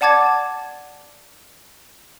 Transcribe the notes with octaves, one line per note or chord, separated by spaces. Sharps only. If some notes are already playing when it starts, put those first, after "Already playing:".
D5 F#5 A5 D6 G#6 A6